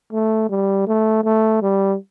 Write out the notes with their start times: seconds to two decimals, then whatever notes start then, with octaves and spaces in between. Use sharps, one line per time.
0.12 A3
0.50 G3
0.87 A3
1.24 A3
1.62 G3